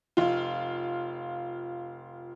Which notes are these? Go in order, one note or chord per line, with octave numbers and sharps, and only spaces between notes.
F1 F4